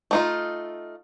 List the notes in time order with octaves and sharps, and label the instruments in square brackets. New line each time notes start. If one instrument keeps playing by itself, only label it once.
[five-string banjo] A3 D#4 F4